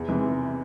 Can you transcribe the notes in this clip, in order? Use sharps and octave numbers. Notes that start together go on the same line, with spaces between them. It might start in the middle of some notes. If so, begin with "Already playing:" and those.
Already playing: E2
C3 E3 G#3